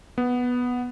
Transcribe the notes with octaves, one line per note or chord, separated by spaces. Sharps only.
B3